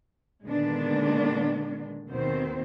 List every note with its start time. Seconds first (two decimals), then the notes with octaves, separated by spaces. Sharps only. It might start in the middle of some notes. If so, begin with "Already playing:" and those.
0.44 A#2 D3 D#3 G#3 B3 D4
2.09 D#2 B2 D#3 C4 C5